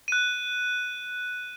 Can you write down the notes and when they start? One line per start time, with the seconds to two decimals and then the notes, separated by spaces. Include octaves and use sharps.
0.08 F#6 D#7